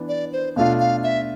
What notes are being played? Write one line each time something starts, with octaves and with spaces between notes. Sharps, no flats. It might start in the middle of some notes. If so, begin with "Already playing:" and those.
Already playing: E3 B3 D4
D5
C5
B2 A3 D4 F4 F5
F5
E5